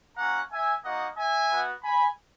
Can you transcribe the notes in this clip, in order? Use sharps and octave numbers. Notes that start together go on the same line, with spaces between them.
A#3 C#4 F#4 F#5 A#5
E5 G#5
A#3 D#4 F#4 D#5 F#5
E5 G#5
B3 F#4
G#5 B5